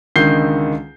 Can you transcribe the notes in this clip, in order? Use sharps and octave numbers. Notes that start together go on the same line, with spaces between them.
C#2 D3 D#3 G6 C7 G7